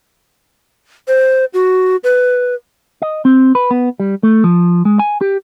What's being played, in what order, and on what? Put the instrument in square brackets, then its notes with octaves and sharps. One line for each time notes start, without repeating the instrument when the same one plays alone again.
[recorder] C5
F#4
B4
[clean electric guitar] D#5
C4
B4
B3
G3
A3
F3
G#3
G#5
G4